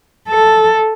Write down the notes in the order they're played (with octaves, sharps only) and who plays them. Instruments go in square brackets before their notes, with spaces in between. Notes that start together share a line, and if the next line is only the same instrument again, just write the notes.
[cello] A4